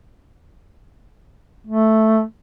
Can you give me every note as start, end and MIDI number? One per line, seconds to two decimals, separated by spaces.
1.67 2.23 57